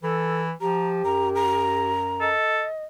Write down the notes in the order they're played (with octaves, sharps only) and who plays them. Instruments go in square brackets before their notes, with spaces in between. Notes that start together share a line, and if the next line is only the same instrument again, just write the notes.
[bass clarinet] E3 [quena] A4
[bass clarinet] F3 [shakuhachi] G4 [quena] A#5
[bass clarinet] F#2 [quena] A#5
[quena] A#5
[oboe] A4 [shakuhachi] D#5